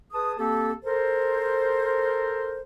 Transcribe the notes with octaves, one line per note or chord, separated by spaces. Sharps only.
G#4 B4 A5 D#6
A#3 C4 G4 A4
A4 A#4 C5